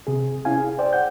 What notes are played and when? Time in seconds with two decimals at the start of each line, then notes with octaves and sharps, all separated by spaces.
0.07 C3 G#4
0.45 C#4 E4 F5 G#5
0.58 G#4
0.79 C5 D5 G5
0.93 F#5 G6